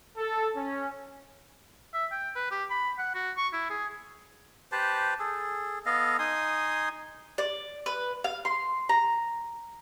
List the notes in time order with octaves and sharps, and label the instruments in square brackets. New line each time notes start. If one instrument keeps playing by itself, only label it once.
[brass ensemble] A4
C#4
[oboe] E5
G5
B4
G4
B5
F#5
F#4
C#6
E4
G#4
[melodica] G4 B4 C5 A5
G#4 A4
B3 A4 D#5 F5
D#4 G#5 C6 D#6
[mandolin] D5
B4
F5
C6
A#5